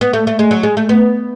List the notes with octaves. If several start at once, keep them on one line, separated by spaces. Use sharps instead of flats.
B3
A3
A3
G#3
F#3
G#3
A3
B3